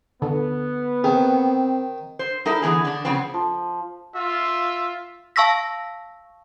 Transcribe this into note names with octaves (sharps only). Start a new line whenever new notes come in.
D3 B3
D#3 C4 G#4
C5
G3 D#4 E4 A4 A#4 E5
D3 E3 B3 G#4
D3 D4
C#3 F3 B3 C4
F3
F4 E5
F5 A5 C#6 E6 A#6 B6